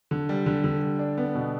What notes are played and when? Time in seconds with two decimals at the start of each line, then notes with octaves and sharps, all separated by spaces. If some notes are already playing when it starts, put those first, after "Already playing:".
0.11 D3
0.29 G3
0.46 D3
0.64 D3
0.82 G3
0.99 D4
1.18 B3
1.35 B2